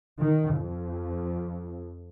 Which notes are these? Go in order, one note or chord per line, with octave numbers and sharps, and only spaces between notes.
D#3
F2